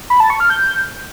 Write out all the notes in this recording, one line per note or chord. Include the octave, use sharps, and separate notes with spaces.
B5
A5
C#6
F6
G6